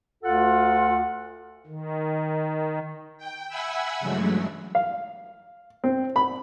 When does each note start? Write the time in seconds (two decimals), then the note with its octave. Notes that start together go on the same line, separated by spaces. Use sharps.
0.23 D2 F4 A4 F#5
1.67 D#3
3.18 G5
3.48 E5 F#5 G#5 B5 E6
4.00 G2 C#3 E3 F#3 G#3 A3
4.75 F5
5.84 C4
6.16 B5